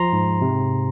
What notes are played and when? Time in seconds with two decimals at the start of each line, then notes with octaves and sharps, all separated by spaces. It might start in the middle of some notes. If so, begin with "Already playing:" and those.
Already playing: F3 A#5 C6
0.13 G#2
0.42 C3